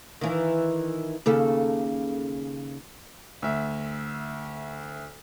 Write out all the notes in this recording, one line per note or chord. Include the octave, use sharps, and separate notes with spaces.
D#3 E3
D#2 C#3 A4
D2 E5